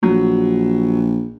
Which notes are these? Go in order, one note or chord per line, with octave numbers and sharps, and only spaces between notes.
A#1 F#3